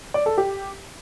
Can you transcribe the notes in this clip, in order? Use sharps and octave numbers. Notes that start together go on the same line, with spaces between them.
D5
A4
G4